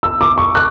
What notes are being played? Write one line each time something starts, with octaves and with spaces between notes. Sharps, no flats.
E6
D6
C#6
F#6